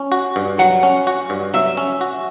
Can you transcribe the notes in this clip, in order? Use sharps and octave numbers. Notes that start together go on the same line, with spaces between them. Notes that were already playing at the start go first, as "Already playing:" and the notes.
Already playing: C#4
F#4
G2
F#3 F#5
C#4
F#4
G2
F#3 E5
C#4
F#4